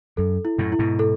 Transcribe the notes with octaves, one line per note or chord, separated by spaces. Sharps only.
F#2 A4
E4
F#2 A2
E4
G#2 B2
A4